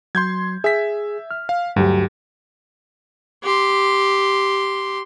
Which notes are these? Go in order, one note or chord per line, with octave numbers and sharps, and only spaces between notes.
F#3 C6 G6 G#6
G#4 E5 B6
F6
F5
D2 G2 F#3 G4
G4 C6